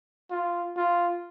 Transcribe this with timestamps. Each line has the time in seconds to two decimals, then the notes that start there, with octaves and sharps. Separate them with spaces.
0.31 F4
0.77 F4